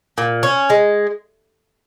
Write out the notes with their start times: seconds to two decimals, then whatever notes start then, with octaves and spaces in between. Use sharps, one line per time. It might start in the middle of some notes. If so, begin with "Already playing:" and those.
0.18 A#2
0.43 C#4
0.70 G#3